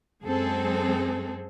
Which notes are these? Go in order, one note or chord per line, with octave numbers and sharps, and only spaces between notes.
F#2 F#3 G#3 C4 G#4 A4